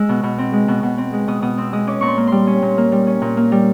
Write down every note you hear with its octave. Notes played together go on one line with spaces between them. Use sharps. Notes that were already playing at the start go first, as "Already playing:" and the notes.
Already playing: G#3 E6
B2
B2
C4
G#3
B2
B2
C4
G#3
B2 D#6
B2 D#6
C4 E6
G#3 D#6
C#4 D6
A#2 C#6
C6
A#3
G3 C6
C#4
A#2
A#3
G3
C#4
A#2
A#3
G3